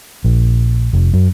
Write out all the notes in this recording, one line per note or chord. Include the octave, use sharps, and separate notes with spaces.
A#1
F1
F#2